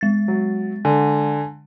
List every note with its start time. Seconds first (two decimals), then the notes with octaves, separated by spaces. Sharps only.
0.01 G#3 A6
0.28 F#3
0.85 D3 G#5